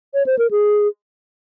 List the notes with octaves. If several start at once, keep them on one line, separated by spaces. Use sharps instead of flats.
C#5
C5
A#4
G#4